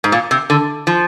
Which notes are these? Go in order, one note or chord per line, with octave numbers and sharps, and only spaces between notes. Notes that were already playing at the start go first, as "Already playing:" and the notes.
G#2
A#2
C3
D3
F3